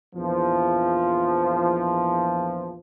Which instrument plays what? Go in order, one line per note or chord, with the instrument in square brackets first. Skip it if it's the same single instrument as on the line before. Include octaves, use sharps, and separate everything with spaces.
[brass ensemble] A#1 E2 E3 F3